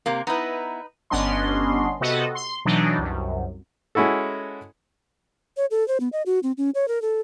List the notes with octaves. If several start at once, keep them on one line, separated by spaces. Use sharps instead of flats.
C3 A#3
B3 D#4 E4 B4
G1 B3 C#4 D4 D#5 C6
C3 B3 F#4 A4 D#5
C6
B2 E3 F#3 D4 D#4
C2 F#2
G#3 C#4 E4 F#4 A4
C#5
A4
C5
B3
D#5
F#4
C4
C#4
C#5
A#4
A4